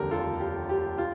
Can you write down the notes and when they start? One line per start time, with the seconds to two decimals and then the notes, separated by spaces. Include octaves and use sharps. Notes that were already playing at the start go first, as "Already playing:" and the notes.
Already playing: F1 D#2 D3 G3 G4 A#4
0.11 F4 A4
0.40 G4
0.69 G4
0.98 F4